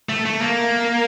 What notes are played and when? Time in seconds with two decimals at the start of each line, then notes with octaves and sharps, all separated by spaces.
0.09 A3
0.25 A3
0.41 A#3